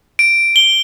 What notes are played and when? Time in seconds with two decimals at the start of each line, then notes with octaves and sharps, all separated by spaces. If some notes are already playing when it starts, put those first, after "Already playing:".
0.19 D7
0.56 G7